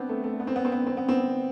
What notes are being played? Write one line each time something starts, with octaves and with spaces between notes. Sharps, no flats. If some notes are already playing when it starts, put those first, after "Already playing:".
Already playing: B3 C4 D4
A3
A3
B3
C4
B3
C4
B3
C4
B3
C4